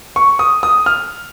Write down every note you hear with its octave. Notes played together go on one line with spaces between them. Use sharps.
C#6
D#6
D#6
F6